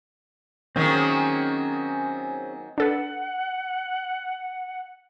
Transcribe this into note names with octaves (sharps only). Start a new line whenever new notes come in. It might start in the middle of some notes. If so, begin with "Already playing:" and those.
D#3 F#3 A#3 C4 C#4 G#4
D4 A4 B4 F#5